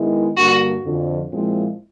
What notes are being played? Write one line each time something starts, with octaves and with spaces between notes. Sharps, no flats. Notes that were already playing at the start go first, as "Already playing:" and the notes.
Already playing: D#3 G#3 B3 E4
G2 D3 G3 A#3 D4 F#4
F2 D3 F3
A#2 F3 G#3 C4 E4